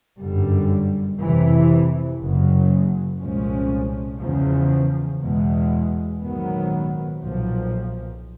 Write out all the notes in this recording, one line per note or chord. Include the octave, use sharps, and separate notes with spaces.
G1 F#2 D3 G3
F2 C3 E3
F#1 F#2 C#3 F#3
C2 A#2 F3 G#3 C#4
E2 C#3 F3
E2 B2 G#3
A#1 G#2 D#3 F#3 B3
B1 A#2 F3